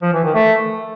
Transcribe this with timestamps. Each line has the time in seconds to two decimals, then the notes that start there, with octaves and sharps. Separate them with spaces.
0.02 F3
0.13 E3
0.24 D#3
0.35 A3